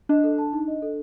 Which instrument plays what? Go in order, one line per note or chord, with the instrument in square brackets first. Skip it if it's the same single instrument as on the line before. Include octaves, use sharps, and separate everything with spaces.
[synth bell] D4 [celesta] D#5
[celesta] A4
A5
D#4
D#5
A4